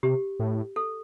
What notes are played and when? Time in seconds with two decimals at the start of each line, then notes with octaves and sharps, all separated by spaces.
0.03 C3 G4
0.39 A2
0.76 A4